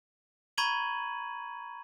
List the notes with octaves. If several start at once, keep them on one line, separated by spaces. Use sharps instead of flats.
A#5 B5 C#6 G#6 D#7 F#7